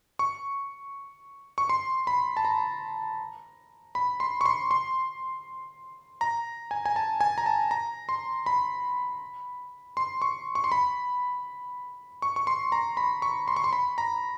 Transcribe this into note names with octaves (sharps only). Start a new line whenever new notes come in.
C#6
C#6
C6
B5
A5
A#5
B5
C6
C#6
C6
C6
A#5
G#5
G#5
A5
G#5
A#5
A5
A#5
C6
B5
C6
C#6
C#6
C6
B5
C#6
C#6
C6
A#5
B5
C#6
C6
C#6
C6
B5
A#5